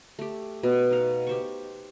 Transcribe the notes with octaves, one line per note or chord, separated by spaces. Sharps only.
A3 G4
B2
D#4 F5
G4 C5 C#6